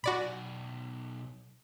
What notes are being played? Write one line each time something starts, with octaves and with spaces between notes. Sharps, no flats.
B1 F#4 D5 G#5 B5